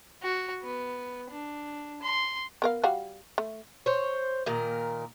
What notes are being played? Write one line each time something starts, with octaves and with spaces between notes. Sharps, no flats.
F#4
B3
D4
C6
B3 A#4 F5
G3 F#4 F5
A3
C5 C#5
A#2 D#3 A#4